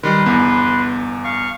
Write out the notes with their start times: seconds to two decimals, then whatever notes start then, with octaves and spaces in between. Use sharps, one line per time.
0.03 D#3 G3 B4 C6
0.26 G1 E2 B3
1.24 F5 C#6